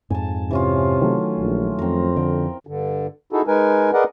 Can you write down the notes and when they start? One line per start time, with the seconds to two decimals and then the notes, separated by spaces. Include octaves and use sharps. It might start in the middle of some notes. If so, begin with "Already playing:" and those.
0.10 F2 G#2 G#5 A5
0.51 C3 E3 C#4 F4
1.01 D#3 F#3 A3
1.40 A#1
1.78 F2 C4 A#4
2.16 D3 G5
2.67 G2 D3
3.33 D#4 E4 F#4 G#4 A4
3.47 G#3 D#4 A#4 B4 G#5
3.93 G#4 A#4 B4 D5 D#5 F#5